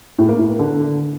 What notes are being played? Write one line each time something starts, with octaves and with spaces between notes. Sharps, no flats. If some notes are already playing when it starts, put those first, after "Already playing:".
A2
A#3
A2
B3
D3